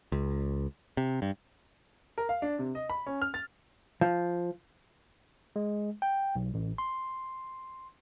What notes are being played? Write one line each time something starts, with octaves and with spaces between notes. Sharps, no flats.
C#2
C3
G2
A#4
F5
D4
C3
D#5
B5
C#4
F6
A6
F3
G#3
G5
B1
A1
C6